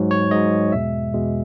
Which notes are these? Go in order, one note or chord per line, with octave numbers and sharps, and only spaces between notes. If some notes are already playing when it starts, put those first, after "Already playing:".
Already playing: G#2 F#3
C#5
G#2 F#3 D#5
E2 B2 G#3 E5
E2 B2 G#3